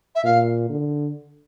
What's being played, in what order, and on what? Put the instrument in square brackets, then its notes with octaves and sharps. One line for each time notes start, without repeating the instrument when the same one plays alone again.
[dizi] E5
[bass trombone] A#2 [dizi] F5
[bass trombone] D3